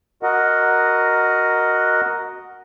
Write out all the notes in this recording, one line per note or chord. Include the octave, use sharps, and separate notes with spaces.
F#4 A#4 D#5 F#5